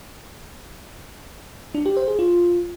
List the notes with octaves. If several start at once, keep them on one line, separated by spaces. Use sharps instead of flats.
D4
G4
C5
G#4
F4